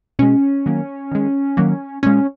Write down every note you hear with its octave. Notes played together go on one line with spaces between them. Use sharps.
B2 G#3 C#4
D#3 F#3 A#3
D#3 G#3
D#3 F#3 A#3
A#2 G#3 C#4